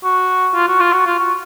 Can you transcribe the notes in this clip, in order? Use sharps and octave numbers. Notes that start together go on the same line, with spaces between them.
F#4
F4
F#4
F4
F#4
F4
F#4